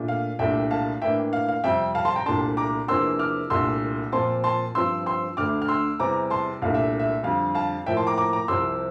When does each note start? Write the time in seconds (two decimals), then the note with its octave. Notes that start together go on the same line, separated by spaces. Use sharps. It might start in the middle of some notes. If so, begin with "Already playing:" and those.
Already playing: A#2 A3 D4
0.08 F5
0.39 C2 A#2 A3 D4 E5 G5
0.71 F5 A5
1.01 A2 E3 A#3 D4 E5 G5
1.33 F5
1.49 F5
1.64 F2 C3 G3 E5 G5
1.95 F5 A5
2.05 A5 C6
2.16 G5 A#5
2.26 C2 A#2 A3 D4 A5 C6
2.57 A#5 D6
2.88 E2 C3 F3 A#3 D4 C6 E6
3.19 D6 F6
3.50 C2 A#2 A3 D4 C6 E6
4.12 A#2 F3 C4 A5 C6
4.44 A5 C6
4.75 G2 F3 C4 C6 E6
5.06 C6 E6
5.37 D2 D3 A3 D4 D6 F6
5.62 F6
5.68 C6 E6
6.00 E2 C3 G3 C4 A#5 D6
6.30 A5 C6
6.62 C2 A#2 A3 D4 F5
6.75 E5
6.99 E5
7.23 F2 D3 G3 F5
7.55 F5 A5
7.86 A2 F3 A#3 E5 G5
7.97 A5 C6
8.07 A#5 D6
8.17 A#5 D6
8.33 A#5 D6
8.48 C2 C3 F3 C4 C6 E6